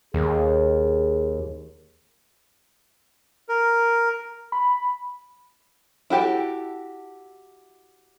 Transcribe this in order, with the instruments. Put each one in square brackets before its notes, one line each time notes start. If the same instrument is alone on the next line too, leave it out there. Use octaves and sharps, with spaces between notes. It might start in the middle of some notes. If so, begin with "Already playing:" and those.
[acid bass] D#2 [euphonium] G#4
[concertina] A#4
[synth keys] B5
[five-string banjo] E4 F#4 G4 A4